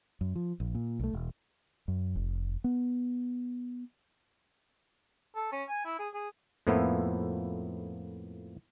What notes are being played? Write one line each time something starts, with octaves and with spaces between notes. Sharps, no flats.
F#2
F3
A#1
A#2
B1 A3
E1
F#2
F1
B3
A4
C#4
G#5
E4
G#4
G#4
F2 A2 F3 A#3 B3 E4